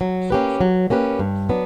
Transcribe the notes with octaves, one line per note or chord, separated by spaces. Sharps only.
F#3
A#3 C#4 G4 B4
F#3
A#3 C#4 G4 B4
G2
F#3 B3 D4